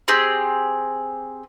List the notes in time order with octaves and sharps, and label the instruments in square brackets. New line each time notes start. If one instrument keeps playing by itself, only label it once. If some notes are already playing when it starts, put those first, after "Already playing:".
[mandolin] C4 G4 G#4